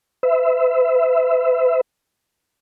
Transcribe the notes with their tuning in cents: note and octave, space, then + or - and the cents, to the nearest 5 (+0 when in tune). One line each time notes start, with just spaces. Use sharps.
B4 +45 E5 +0